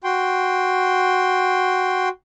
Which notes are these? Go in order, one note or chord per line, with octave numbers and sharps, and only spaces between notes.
F#4 G5 C6